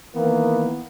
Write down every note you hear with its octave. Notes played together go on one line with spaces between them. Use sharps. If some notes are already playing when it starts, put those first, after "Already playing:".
D#3 E3 A#3 B3